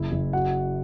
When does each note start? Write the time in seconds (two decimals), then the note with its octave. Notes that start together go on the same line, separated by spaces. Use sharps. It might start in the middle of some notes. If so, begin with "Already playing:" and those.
Already playing: F#1 E4 E5
0.12 F#1
0.33 F#4 F#5